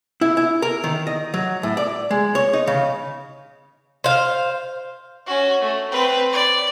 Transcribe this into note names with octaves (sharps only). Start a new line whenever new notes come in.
E4
E4
A#4
D#3
D#5
F#3
A2
D5
G#3
C#5
D#4
C#3
C5 F5
C#4 F#4
A3
C4 B4
D5